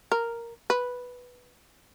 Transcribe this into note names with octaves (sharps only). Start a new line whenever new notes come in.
A#4
B4